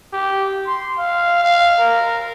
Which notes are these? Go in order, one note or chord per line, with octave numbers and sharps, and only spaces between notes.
G4
C6
F5
F5
A#4